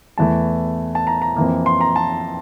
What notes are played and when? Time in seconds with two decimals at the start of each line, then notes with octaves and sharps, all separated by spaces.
0.18 E2 E3 A3 A5
0.95 A5
1.07 A#5
1.22 A#5
1.36 F2 E3 A#3
1.66 C6
1.81 A#5
1.96 A5